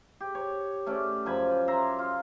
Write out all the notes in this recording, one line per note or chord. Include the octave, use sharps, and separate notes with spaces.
G4
C#5
A3 C#4 D5
F#2 F3 G#5 B5
E5 A#5 C6
F4